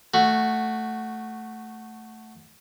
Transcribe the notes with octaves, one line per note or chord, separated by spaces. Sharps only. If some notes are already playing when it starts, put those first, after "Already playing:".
A3 F#4